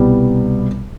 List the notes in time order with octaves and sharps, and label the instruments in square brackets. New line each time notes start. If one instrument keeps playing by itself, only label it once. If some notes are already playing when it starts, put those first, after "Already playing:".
Already playing: [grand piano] C2 B2 G3 B3